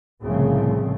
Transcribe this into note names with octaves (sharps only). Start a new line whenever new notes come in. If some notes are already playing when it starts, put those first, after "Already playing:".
C2 A2 C#3 F3 A3 C4